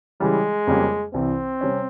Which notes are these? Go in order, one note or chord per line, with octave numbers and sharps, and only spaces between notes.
C#3 E3 G3 G#3
F2 C#3 G3 A#3
C2 C3 E3 C4
C3 G3 C#4